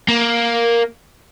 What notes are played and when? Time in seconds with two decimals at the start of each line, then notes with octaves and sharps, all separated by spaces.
0.08 A#3